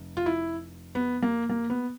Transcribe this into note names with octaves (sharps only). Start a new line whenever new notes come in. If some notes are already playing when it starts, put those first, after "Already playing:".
Already playing: F1
F4
E4
B3
A#3
A#3
B3